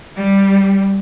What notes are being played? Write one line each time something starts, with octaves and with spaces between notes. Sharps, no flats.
G3